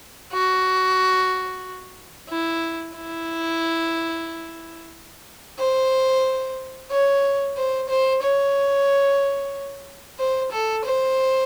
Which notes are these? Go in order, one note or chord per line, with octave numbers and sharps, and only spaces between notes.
F#4
E4
E4
C5
C#5
C5
C5
C#5
C5
A4
C5